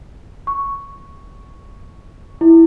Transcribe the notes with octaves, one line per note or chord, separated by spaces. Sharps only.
C#6
E4